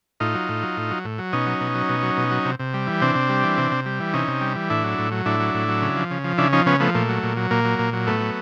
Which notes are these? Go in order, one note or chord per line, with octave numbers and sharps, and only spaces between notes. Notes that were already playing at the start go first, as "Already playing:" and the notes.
A2 D#4 F4
F#3
A2
F#3
A2
F#3
A2
F#3
B2 C#4 D#4
F#3
B2
F#3
B2
F#3
B2
F#3
C3
C3
G3
E3
C3 C4 D4
C3
G3
E3
C3
C3
G3
E3
C3 C#4 D#4
C3
G3
E3
A2 D4 E4
F#3
A2
F#3
A2 D4 E4
F#3
A2
F#3
C#3
F3
C#3
F3
C#3 D4 E4
F3 C#4 D#4
C#3 B3 C#4
F3 A3 B3
A#2 A3
F#3
A#2
F#3
A#2 A#3
F#3
A#2
F#3
A2 A3 B3
F#3